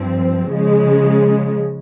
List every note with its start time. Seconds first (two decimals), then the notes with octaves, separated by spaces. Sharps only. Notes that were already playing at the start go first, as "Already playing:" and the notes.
Already playing: G2 F3 C4
0.51 C#3 F3 G#3